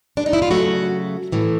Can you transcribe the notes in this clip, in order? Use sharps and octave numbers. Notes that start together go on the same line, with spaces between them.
D4
D#4
E4
F4
C#3 F#3 A3 F#4
A2 E3 A3